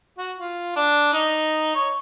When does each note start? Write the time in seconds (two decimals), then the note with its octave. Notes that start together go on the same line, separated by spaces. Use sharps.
0.18 F#4
0.38 F4
0.76 D4
1.13 D#4
1.75 C#5